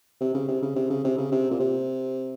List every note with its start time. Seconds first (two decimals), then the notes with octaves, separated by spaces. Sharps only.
0.21 C3
0.34 C#3
0.48 C3
0.62 C#3
0.76 C3
0.90 C#3
1.04 C3
1.18 C#3
1.32 C3
1.51 A#2
1.59 C3